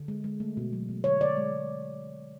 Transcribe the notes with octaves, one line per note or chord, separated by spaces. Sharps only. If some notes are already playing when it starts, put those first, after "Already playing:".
Already playing: D3
G#3
G#3
A3
B2
F#3
B2
D3 C#5
D3 D5
G#3
G#3